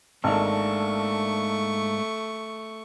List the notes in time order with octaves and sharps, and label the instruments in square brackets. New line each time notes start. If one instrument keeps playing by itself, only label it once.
[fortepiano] G#1 [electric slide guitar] G#2 A#3 D4 [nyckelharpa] A3 C#6